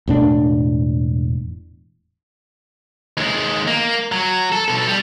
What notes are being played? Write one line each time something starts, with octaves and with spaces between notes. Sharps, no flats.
E1 A2 D4
D#2 G#3
A#3
F#3
A4
B2 A4
G3